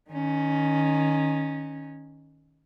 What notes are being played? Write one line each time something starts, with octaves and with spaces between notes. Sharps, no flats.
D#3 C#4